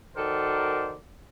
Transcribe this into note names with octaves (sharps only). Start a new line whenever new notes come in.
D#3 F#4 A4 A#4 C5 D5